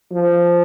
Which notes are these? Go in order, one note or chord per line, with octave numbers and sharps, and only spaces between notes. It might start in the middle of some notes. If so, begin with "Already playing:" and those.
F3